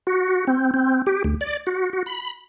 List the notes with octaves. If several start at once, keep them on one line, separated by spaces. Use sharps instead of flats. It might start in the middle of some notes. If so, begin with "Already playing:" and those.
F#4
C4
C4
G4
D2
D5
F#4
F#4
B5